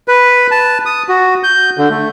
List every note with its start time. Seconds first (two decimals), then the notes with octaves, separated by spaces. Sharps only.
0.08 B4
0.51 A5
0.86 D#6
1.09 F#4
1.43 G6
1.78 D3
1.90 A3